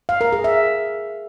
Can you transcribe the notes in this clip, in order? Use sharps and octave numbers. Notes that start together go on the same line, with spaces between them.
F5
A#4
G#4
E5